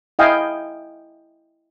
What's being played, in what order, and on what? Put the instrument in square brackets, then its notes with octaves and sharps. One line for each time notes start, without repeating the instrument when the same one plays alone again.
[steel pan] E4 D#5 F5 G5 G#5